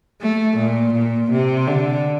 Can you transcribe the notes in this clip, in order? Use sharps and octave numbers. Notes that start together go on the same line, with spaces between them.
A3
A#2
A#2
C3
D3